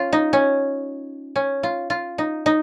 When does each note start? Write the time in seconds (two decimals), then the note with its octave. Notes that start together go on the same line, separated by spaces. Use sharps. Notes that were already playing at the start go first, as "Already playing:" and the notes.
Already playing: C#4 F4
0.13 D#4
0.33 C#4
1.36 C#4
1.63 F4
1.90 F4
2.18 D#4
2.46 D#4